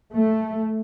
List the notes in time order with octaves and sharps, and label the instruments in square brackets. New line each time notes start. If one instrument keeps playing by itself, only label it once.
[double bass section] A3